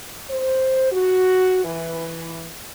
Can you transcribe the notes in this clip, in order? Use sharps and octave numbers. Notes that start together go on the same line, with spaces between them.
C5
F#4
E3